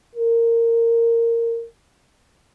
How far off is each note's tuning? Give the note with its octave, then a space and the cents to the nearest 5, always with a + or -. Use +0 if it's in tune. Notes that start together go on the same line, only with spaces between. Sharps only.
A#4 -15